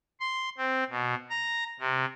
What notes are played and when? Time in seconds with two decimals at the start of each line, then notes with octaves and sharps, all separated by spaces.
0.20 C6
0.58 C4
0.90 B2
1.30 A#5
1.80 C3